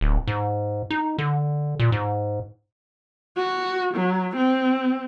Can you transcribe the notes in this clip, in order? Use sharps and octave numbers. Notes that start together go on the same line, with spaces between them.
D1
G#2
D#4
D3
A#2
G#2
F#4
F#3
C4